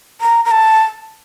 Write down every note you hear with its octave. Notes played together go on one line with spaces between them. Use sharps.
A#5
A#5
A5